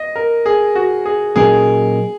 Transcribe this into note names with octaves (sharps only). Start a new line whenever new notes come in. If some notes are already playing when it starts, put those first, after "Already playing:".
Already playing: D#5
A#4
G#4
F#4
G#4
A#2 F#3 C#4 G#4 A#4 D#5